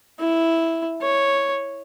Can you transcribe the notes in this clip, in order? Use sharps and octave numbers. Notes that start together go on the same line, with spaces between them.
E4
C#5